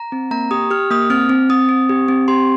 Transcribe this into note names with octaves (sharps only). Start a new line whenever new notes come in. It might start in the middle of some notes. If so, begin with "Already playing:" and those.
Already playing: A#5
C4
A#3 A#5
G4 D#6
G4 F6
A#3 D#6
C4 F6
C4
C4 D#6
C4
G4
C4
G4 C6